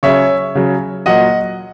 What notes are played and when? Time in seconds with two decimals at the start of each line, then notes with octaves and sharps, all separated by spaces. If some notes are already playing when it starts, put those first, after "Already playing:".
0.03 C#3 F#3 C#5 E5
0.55 C#3 F#3
1.06 A#2 F#3 D#5 F#5